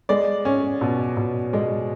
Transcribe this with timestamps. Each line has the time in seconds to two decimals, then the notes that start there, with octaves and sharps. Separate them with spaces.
0.09 G#3 D5
0.45 C#4
0.81 B2
1.17 B2
1.53 G#3 D5